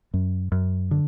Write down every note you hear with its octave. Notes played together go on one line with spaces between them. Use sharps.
F#2
F#2
D3